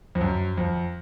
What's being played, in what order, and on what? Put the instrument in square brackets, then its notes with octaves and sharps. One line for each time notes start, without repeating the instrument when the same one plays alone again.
[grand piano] F2
F#2
F2